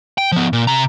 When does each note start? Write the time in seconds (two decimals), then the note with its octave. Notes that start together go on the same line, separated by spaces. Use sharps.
0.18 G5
0.32 F3 B3
0.53 A#2
0.67 C3 A#5